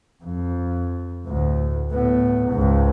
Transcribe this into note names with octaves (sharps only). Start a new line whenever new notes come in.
F2
D2 A2
A2 B3
C#2 G#2